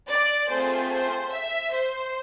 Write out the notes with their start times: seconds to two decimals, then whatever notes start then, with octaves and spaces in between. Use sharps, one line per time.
0.09 D5
0.50 A3 C4 F4 G#4 C5
0.92 C5
1.33 E5
1.74 C5